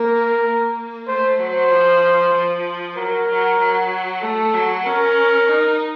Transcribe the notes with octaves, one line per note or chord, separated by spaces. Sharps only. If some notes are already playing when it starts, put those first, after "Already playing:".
Already playing: A#3 A#4
A#3
A3 C5
F#3 C5
F3
F3
F#3 A#4
F#3
F#3
A3 A4
F#3
C#4 A#4
D#4